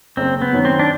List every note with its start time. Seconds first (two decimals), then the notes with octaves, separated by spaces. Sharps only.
0.17 F#1 C4
0.42 B3
0.53 F#2 D#3
0.65 C4
0.79 D4